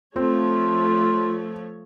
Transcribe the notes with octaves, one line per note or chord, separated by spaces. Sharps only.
F3 A3 C4 F4 C#5